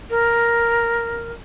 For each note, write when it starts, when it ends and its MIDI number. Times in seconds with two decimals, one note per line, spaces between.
0.10 1.33 70